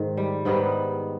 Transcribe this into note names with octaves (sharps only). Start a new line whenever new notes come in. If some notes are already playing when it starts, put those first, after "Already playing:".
Already playing: G#2 D#3
G3
G#2 D#3 G3 B3